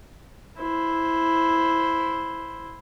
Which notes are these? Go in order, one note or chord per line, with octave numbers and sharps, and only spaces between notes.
E4 C5